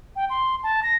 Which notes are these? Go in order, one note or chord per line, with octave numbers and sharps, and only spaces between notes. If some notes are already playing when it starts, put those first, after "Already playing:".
G5
C6
A5
A#6